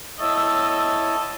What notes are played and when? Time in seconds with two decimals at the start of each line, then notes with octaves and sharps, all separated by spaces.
0.20 A2 B3 E4 C#5 D#5 A5 E6